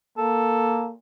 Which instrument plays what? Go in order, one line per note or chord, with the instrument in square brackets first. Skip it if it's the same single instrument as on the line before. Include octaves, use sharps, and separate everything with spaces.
[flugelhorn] A#3 [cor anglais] A4